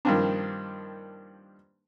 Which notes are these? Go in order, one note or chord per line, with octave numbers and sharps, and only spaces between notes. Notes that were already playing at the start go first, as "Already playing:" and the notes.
G2 D#3 F3 A#3 C4 D4